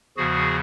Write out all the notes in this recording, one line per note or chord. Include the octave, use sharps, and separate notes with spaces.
E2 C#3 F3 F#4 G#4